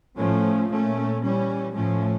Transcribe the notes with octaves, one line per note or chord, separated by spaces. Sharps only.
A2 F3 A3 C#4
A#2 A3 C#4
E3 G3 C#4
A2 F3 A3 C#4